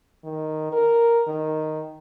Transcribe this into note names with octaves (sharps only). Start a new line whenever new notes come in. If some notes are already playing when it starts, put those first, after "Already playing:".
D#3
A#4
D#3